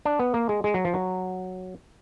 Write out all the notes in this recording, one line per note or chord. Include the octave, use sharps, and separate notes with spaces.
D4
B3
A#3
G#3
G#3
F#3
F3
F#3